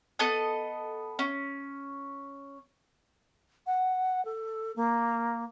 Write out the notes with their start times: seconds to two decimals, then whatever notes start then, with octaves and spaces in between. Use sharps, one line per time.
0.19 B3 A4 D#5
1.19 C#4
3.67 F#5
4.25 A4
4.76 A#3